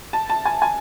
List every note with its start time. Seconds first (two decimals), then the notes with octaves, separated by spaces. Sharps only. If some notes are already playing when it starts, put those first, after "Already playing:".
0.13 A5
0.30 A5
0.45 G#5
0.62 G#5